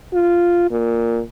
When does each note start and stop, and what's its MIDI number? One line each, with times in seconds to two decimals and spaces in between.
0.14 0.71 65
0.71 1.21 46